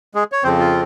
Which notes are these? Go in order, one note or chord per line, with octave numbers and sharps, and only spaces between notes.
G#3 G#4
C#5
F2 C#3 F3 C4 C5
F4